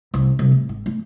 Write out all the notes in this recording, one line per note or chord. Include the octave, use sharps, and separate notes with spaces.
C2
C2
A2
G#1
A3